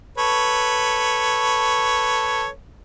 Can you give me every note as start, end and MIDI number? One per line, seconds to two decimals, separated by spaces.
0.18 2.48 69
0.18 2.48 71
0.18 2.48 73